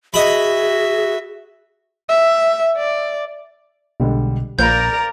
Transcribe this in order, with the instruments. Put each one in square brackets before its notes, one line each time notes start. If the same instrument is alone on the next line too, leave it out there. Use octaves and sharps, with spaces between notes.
[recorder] F#4 [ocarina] G#4 [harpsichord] D#5 B5 [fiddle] E5
[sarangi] E5
D5
[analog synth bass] B1 [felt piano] D3 G3 G#3
[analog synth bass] A#1 [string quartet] A#4 D5 A#5 [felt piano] C5 F5 B5 [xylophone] G6